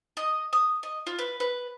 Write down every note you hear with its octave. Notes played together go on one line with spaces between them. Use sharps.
D#5
D#6
D#5
F4
B4
B4